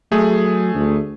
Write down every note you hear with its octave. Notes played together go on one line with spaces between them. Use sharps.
F#3 A3 G#4
D2